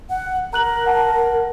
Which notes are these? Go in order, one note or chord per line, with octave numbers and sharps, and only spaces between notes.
F#5
A#4 A#5 F#6 F#7
F#5 A5